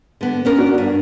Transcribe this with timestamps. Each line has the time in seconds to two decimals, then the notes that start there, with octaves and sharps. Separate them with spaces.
0.21 D3 B3
0.45 B3 C#4 A#4
0.58 D4 F#4
0.78 G2